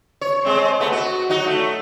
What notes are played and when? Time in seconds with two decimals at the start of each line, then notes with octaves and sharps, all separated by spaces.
0.21 C#5
0.45 G#3 C4
0.80 A3 B3
0.92 F#4
1.29 F#3 D#4 F#4
1.46 A3